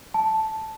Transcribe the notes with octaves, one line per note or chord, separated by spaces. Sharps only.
A5